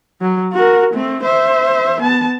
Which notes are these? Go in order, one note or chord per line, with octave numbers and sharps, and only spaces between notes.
F#3
F#4 A#4
A3 C4
C5 E5
B3 A5